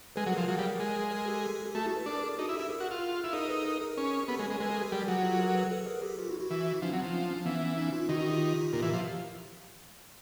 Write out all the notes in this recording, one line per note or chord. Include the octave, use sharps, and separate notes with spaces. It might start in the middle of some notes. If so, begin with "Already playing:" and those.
G#3 A4 B4
F#3
G#4 A#4
F3
F#3
G3
G#3
G#4 A#4
G4 A4
G4
A3 F#4 G#4
E4 F#4
A4 B4
D4 G#4 A#4
A4
G#4 A#4
D#4 F#4 G#4
E4
G4 A4
E4
G#4 A#4
F#4
F4
E4
D#4 G#4 A#4
A4 B4
G#4 A#4
G#4 A#4
C#4
B3 G4 A4
G#3
G#4 A#4
G#3
G#3 A4 B4
G#4 A#4
G4 A4
G3 G#4 A#4
F#3 F#4 G#4
F4 G4
A4
G#4 A#4
A4 B4
A4 B4
G#4 A#4
G4 A4
F4 G4
E4 F#4
E4 F#4
E3
F3 C#4 D#4
F#3 C4
F3
C#4
D4
C#4
D4
E3 B3 C#4
C#4 D#4
D#4 F4
D#3 E4 F#4
E4 F#4
F4 G4
A#2
E3
F3